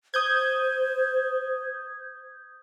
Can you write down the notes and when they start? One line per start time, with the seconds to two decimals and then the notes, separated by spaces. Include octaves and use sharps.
0.14 C5 D#6 G6 G#6